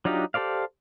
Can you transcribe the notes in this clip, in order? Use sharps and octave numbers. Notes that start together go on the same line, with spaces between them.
F#3 D4 D#4 F4 G4
G4 A4 C5 D5 F5